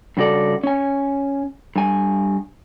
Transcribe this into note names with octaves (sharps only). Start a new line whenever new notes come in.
G2 C#3 F#4 A4 D5
C#4 G#5
G2 G#5